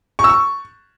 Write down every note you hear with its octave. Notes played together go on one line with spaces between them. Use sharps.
C#6
E6
C#6